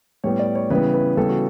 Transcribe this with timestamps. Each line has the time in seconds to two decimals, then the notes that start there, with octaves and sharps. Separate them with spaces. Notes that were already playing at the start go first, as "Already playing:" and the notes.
0.24 A2 G3 B3 C#5
0.39 D5
0.55 C#5
0.70 C#3 E3 G3 B3 B4
0.94 B4
1.17 C#3 E3 G3 B3 A4
1.29 F#4